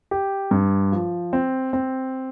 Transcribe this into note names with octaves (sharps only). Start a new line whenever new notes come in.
G4
G2
F3
C4
C4